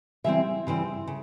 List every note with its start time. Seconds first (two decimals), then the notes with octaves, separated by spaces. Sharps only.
0.24 C#3 E3 G3 C4 E5
0.67 C#3 E3 G3 C4
1.07 C#3